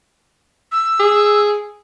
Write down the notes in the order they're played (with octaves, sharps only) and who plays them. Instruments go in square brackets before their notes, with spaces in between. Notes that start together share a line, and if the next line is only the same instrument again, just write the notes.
[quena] E6
[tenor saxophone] G#4